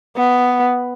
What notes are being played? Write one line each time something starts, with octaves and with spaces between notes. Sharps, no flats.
B3